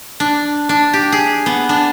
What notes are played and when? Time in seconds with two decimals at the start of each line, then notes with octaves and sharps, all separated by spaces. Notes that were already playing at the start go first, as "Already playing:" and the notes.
0.20 D4
0.69 D4
0.93 G4
1.12 G#4
1.46 B3
1.69 D4